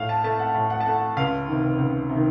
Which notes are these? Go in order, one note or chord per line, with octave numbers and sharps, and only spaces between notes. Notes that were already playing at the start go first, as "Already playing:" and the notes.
Already playing: A2 F5
A5
A3 A5
F#5
A2 A5
F#5
A5
A3 F#5
C#2 F5
C3 D#3
C#2
C3
D#3